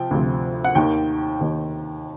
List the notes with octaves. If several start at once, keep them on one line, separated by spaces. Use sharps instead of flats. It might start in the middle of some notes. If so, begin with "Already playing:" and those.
Already playing: C3 F3 G5
D2 C3 F3
F#5
D#2 D#3 G5
D#2 D#3